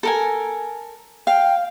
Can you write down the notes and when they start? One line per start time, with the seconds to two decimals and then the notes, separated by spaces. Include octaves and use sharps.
0.03 A4 A#4 G#5
1.27 F5 G5